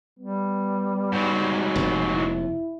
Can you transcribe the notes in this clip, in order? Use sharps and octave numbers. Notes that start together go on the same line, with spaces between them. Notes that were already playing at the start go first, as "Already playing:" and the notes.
G3 B3
G#2 F#3
F1 D#2
E4